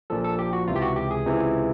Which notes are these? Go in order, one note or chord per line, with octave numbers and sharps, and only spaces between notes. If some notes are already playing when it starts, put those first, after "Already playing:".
A#1 A#2 F3 A4
A4
G4
F#4
C#2 C3 E3 F4
G4
F#4
G4
G#4
C#2 C3 E3